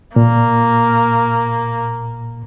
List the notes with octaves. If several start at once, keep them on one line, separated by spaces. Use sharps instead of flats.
A#2 A#3